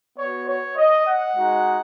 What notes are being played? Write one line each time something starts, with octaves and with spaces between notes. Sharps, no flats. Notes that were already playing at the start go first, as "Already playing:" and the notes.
B3 F#4 C#5
C#5
D#5
F#5
G#3 D#4 F#4